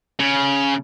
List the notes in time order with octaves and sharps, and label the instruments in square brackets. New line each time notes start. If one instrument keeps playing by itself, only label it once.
[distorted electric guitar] C#3